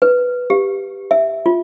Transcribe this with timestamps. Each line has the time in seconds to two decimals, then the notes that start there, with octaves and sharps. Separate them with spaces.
0.02 B4
0.50 G4
1.11 E5
1.46 F4